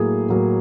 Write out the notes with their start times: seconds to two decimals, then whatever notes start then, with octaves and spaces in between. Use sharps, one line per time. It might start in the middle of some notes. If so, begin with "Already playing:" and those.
Already playing: A2 F#3 A#3 G#4
0.29 A2 F#3 A#3